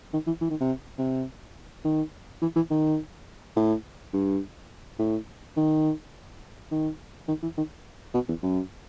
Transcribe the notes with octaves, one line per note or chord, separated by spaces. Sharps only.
D#3
E3
E3
D#3
C3
C3
D#3
E3
E3
D#3
A2
G2
A2
D#3
D#3
D#3
E3
D#3
B2
E2
F#2